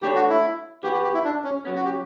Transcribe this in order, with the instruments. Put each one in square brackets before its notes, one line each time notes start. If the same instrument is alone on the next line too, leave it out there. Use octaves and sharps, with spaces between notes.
[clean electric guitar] E3 A3 D4 A4 C#5 [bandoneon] G4
[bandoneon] F#4
E4
[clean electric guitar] E3 B3 F#4 [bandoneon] G4
[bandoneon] G4
G4
E4
D4
C#4
[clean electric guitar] C#3 F#3 C#4 [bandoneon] B3
[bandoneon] F#4
G4